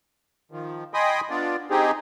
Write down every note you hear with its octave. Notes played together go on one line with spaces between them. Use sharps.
D#3 F3
D#5 G5 G#5 B5 C6 D#6
B3 D4 F4 D5
C4 D#4 G4 G#4